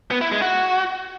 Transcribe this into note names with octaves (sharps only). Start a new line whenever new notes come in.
B3
E4
G#3
F#4